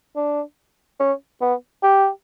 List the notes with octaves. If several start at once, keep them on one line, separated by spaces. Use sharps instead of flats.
D4
C#4
B3
G4